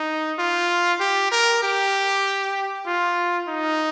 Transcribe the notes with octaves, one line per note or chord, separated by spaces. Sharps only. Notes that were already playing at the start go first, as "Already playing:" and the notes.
Already playing: D#4
F4
G4
A#4
G4
F4
D#4